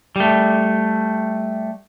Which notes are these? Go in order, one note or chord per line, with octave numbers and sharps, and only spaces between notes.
G3 A3